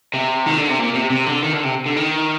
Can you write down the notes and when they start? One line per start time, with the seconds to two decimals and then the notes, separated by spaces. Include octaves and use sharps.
0.14 C3
0.46 D#3
0.57 D3
0.68 C3
0.78 A#2
0.94 C3
1.10 C3
1.26 D3
1.43 D#3
1.54 D3
1.64 C3
1.86 D3
1.96 D#3